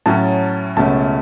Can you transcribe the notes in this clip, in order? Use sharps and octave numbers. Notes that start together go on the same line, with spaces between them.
A2 F#3 C#4 A5
C#2 B2 A3 C#4 A5